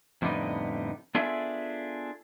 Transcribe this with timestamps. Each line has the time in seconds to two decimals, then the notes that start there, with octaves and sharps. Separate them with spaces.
0.22 F2 A2 D3 G3 B3 D#4
1.15 B3 D4 F4 G#4 A4 E5